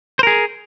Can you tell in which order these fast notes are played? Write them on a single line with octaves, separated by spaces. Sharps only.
C5 A#4 G#4